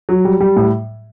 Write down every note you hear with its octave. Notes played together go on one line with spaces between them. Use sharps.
F#3
G3
G3
A2